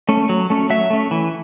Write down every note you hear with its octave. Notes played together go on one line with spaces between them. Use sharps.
A3 C#4
F#3
A3 C#4
F#3 E5
A3 C#4
E3